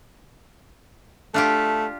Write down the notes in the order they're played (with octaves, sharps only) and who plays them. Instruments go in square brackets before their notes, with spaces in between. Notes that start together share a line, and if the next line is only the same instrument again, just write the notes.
[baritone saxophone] A3 [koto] D4 F4 G4